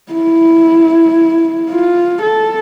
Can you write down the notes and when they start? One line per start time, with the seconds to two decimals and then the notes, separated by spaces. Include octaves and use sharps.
0.12 E4
1.70 F4
2.22 A4